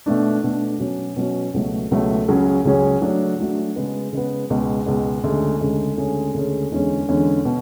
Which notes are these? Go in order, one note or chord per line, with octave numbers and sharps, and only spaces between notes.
B2 A3 D4
B2 A3 D4
B2 F#3 C#4 F#4
B2 F#3 C#4 F#4
C#2 B2 F#3 A3
C#2 B2 F#3 A3
C#2 C#3 F#3 C#4 G#4
C#2 C#3 F#3 C#4 G#4
F#3 A3 D4 F#4
F#3 A3 D4 F#4
C#3 G#3 B3
C#3 G#3 B3
C#2 B2 G#3
C#2 B2 G#3
D2 C#3 G#3
D2 C#3 G#3
D2 C#3 G#3 C#4 G#4
D2 C#3 G#3 C#4 G#4
E2 D3 G#3 C#4
E2 D3 G#3 C#4
B2